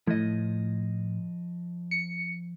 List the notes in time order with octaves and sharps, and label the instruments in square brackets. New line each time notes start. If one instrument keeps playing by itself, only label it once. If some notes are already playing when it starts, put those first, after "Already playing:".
[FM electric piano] A2 [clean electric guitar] F3 D#5
[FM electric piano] C#7